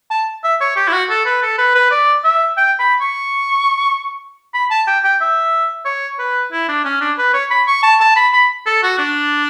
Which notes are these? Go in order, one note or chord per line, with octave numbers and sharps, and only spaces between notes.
A5
E5
C#5
G4
E4
F#4
A4
B4
A4
B4
B4
D5
E5
G5
B5
C#6
B5
A5
G5
G5
E5
C#5
B4
E4
D4
C#4
D4
B4
C#5
B5
C#6
A5
A5
B5
B5
A4
F#4
D4